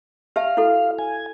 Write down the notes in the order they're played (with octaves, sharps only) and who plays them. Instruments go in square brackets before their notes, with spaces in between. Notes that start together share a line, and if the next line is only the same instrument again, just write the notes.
[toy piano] G4 E5 A5 [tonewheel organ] F5
[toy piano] E4 F#4 A4
[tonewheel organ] G#5